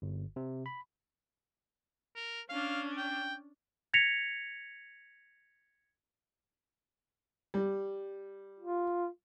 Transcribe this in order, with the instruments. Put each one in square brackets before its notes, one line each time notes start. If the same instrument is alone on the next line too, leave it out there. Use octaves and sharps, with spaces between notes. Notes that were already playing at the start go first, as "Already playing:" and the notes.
[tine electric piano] G1
C3
B5
[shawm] A#4
[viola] C#4 D4 [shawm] F5
[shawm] G5
[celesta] G#6 A#6 B6 C#7 F7
[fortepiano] G3
[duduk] F4